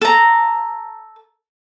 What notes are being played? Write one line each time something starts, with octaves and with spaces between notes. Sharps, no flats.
A4 A#5